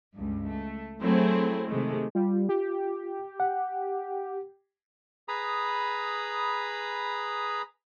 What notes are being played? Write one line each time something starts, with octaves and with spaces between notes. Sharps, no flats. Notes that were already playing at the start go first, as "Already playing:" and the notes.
C#2 G2
A3
F#3 A3 C4 E4 G#4 C5
C3 D#3 G#3 A3
G3 F4
G4
F#5
G#4 B4 A#5 B5 D#6